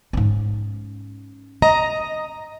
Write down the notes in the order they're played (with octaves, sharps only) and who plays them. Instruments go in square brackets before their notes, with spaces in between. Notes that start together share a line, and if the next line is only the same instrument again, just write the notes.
[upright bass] G#2 C#4
[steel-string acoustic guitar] D#5 A#5